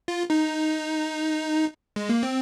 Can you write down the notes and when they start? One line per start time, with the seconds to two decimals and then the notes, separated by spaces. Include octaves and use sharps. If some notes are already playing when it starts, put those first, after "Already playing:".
0.08 F4
0.30 D#4
1.96 G#3
2.09 A#3
2.23 C4